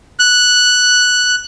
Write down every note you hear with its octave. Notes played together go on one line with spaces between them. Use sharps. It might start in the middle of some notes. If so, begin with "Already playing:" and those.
F#6